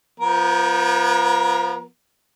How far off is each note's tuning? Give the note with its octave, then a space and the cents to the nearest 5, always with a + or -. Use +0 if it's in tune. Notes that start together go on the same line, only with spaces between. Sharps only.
F3 -10 B3 -35 A#4 +15